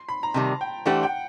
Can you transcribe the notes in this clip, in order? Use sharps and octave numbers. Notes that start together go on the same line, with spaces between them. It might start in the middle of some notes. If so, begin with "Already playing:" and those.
Already playing: C6
B5
A#5
C3 D#3 G3 A5
G5
E3 A3 D4 G4 C5 F#5
G5